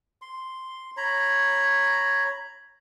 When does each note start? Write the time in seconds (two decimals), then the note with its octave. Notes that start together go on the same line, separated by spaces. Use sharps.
0.22 C6
0.97 C#5 A#5 B5